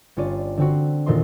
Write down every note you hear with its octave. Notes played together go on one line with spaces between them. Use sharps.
G1 C#4 F4 C#5 D5 D#7
D3 C4 F#4
E1 A#2 D#3 A4 D#5 C6